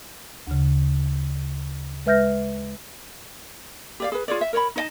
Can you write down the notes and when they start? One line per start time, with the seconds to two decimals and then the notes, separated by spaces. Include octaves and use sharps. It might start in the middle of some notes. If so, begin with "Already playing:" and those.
0.47 D2 C#3
2.06 G#3 B4 E5 F6 G6 A#6
4.00 G4 D5 F5
4.12 G#4 B4
4.28 F4 G#4 C#5 D5
4.41 E5
4.53 A#4 C#5 D5 B5
4.76 D#4 C#5 D#5 A5